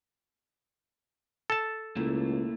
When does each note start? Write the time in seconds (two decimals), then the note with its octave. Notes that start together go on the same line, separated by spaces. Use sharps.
1.50 A4 A5
1.96 C#2 A3 A#3 E4